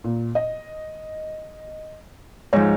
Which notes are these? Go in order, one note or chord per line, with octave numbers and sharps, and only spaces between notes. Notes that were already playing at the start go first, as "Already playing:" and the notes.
A#2
D#5
G#2 F3 C#5